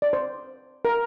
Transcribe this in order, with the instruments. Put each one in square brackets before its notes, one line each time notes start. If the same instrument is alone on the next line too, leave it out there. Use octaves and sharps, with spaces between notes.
[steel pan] D5
C5
A#4